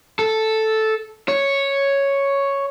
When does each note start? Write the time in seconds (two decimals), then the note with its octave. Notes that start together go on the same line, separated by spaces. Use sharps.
0.19 A4
1.28 C#5